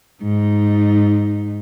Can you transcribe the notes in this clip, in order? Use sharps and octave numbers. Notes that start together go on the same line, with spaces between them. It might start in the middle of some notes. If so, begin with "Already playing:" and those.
G#2 D#4